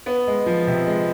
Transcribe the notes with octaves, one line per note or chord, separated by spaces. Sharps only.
B3
G#3
F3
C3
G#3